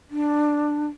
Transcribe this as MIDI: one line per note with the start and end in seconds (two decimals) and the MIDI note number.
0.11 0.87 62